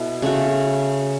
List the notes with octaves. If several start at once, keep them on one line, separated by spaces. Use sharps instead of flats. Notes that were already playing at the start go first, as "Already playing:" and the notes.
Already playing: B2 E4 A4
C#3 A3 F#4